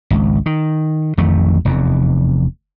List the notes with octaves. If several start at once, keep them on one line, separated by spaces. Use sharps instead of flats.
G#1 C#2
D#3
A1 F2 D#3 A3
F1 E2